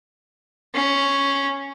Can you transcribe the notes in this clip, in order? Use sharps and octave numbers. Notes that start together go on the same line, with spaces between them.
C#4